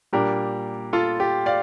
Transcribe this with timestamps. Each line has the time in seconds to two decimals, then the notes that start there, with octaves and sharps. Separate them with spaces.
0.13 A#2 G3 A#3 D4 G4 A#4
0.93 F4 A4
1.20 G4
1.46 D5 F5